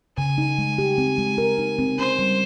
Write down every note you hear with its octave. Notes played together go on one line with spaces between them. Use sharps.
C#3 G#5
D#4
G#3
G4
C4
G#3
A#4
D#4
C4
C#4 C5
G3